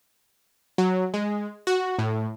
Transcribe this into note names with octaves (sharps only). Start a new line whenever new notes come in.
F#3
G#3
F#4
A2